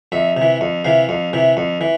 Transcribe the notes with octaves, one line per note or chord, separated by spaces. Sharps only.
F2 E5
C3
E3
F2
C3 E3 F5
F2
C3 E3
F2
E3